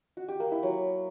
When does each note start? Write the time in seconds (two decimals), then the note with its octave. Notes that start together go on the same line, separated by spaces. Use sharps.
0.17 F#4
0.28 G4
0.40 A#3
0.51 E4
0.63 F#3